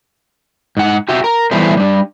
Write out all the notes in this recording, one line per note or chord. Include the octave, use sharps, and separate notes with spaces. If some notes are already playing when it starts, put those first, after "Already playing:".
G#2 F#5
F#4 G4 E5
A#4
E3 G3 A3 B3 C5
G3 D4